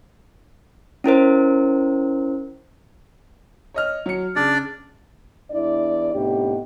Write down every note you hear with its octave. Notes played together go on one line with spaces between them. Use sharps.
C#4 E4 A#4 C5
C#5 D#5 F6
F#3 C#7
C#3 D4 D5
E2 D4 E4 D5
A2 C3 B3 D4 D#4 G4